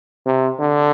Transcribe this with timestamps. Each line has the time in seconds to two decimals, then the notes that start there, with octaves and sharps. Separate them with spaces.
0.26 C3
0.60 D3